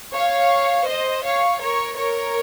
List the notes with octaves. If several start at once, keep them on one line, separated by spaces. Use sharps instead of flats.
C#5 F5
C5 D#5
C#5 F5
A#4 C#5
A#4 C#5